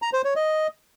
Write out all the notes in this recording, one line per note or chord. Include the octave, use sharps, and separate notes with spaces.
A#5
C5
C#5
D#5